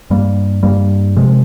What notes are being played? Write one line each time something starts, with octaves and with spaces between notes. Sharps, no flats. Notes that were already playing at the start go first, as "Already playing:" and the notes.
G2 G3 A#3
G2 G3 A#3
C3 F3 G#3